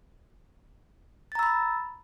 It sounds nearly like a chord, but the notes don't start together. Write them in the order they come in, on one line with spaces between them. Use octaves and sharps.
A6 A#5 E6 B5